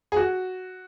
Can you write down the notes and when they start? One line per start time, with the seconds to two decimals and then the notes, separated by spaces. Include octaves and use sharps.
0.12 G#4
0.16 F#4